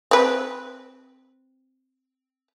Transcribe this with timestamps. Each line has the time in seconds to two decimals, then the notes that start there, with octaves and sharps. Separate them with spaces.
0.11 C4 B4